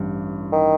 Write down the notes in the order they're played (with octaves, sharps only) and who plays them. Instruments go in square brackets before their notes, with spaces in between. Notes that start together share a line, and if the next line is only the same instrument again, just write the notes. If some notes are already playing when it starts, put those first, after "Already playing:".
Already playing: [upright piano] A1 G2
[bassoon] D#3